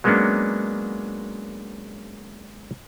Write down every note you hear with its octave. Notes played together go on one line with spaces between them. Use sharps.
F#3 G#3 A#3 B3 C#4 D4